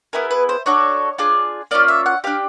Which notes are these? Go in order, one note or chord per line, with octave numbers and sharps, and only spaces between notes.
B3 E4 G#4 A#4
B4
C5
D4 F#4 A4 C#5
D4 F4 G#4
A#3 C#4 F4 D5
E5
F#5
D4 G4 F5